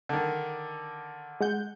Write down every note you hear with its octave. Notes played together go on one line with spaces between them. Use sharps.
D3 D#3
G#3 F#5 G6